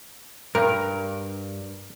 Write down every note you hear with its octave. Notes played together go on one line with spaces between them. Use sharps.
G2 A#4